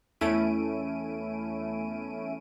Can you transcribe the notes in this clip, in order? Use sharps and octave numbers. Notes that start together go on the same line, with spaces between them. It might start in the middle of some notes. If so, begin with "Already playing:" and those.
E2 A3 C#4 E4 D7 D#7